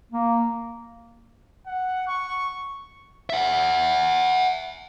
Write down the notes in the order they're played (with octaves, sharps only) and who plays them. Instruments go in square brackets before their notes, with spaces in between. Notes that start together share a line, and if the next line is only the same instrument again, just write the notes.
[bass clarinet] A#3
[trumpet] F#5
C#6
[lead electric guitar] E5 F#5